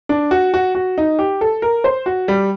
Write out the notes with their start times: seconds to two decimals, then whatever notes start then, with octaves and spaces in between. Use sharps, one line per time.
0.09 D4
0.31 F#4
0.54 F#4
0.75 F#4
0.98 D#4
1.19 G4
1.41 A4
1.62 A#4
1.84 C5
2.06 F#4
2.28 G3